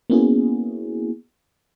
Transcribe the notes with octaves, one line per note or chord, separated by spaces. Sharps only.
A#3 B3 C#4 E4 F#4 G#4